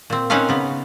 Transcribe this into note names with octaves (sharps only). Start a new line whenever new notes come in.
A#2 C4
C4 C#4 D#4 B4 C#5 F5
C#3 B3